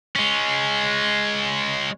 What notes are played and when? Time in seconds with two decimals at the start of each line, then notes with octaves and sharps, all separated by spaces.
0.16 G#3 C#4